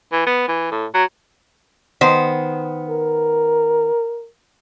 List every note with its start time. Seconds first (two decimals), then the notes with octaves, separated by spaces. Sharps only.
0.12 E3
0.26 B3
0.48 E3
0.71 A2
0.94 F#3
2.01 D#3 B3 C5
2.90 A#4